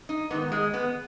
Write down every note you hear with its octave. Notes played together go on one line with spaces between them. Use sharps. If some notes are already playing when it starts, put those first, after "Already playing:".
D#4
G#2 D#3 B3
G#3
B3